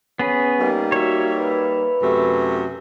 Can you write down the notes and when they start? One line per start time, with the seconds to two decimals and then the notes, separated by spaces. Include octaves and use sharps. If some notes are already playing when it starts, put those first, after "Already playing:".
0.19 B3 C#4 G#4 B4
0.60 G3 A#3 D#4
0.92 F#4 C#5 E5
1.38 B4
2.02 F#2 C3 A3